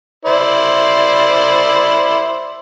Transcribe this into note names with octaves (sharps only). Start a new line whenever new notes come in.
E4 C5 D5